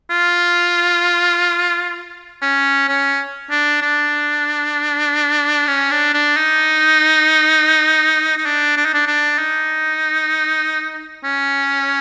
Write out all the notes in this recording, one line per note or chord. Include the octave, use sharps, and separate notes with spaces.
F4
C#4
C#4
D4
D4
C#4
D4
D4
D#4
D#4
D4
D4
D#4
D4
D4
D#4
C#4